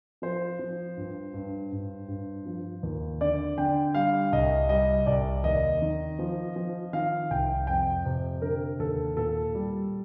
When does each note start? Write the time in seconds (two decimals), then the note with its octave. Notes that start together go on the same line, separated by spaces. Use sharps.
0.22 F3 C5
0.59 F3
0.97 G2
1.34 G2
1.72 G2
2.08 G2
2.46 F3
2.83 D#2
3.21 D3 D5
3.58 D3 G5
3.95 G3 F5
4.32 C2 D#5
4.69 G3 D#5
5.06 C2 D5
5.44 D#2 D#5
5.82 D#3
6.19 F3
6.56 F3
6.93 D#3 F5
7.30 C2 G5
7.67 F2 G5
8.05 C3
8.42 D3 A#4
8.79 D#2 A4
9.17 A#2 A4
9.55 G3